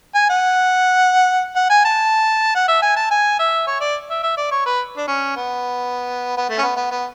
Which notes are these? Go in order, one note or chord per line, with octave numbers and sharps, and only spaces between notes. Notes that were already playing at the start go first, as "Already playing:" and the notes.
G#5
F#5
F#5
G#5
A5
F#5
E5
G#5
A5
G#5
E5
C#5
D5
E5
E5
D5
C#5
B4
D4
C#4
B3
B3
A3
C#4
B3
B3
B3